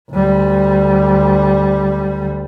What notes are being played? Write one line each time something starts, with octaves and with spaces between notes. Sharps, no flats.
D2 G3